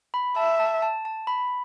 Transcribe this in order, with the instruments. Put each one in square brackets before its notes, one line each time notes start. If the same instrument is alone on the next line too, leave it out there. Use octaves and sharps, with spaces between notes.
[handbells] B5
[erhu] E5 [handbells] A5
[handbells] A5
A5
A5
B5